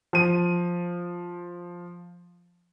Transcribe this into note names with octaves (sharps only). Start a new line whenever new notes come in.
F3 D#7